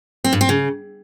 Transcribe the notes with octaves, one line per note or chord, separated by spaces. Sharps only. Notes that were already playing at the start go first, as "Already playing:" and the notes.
C4
G2
C4
C#3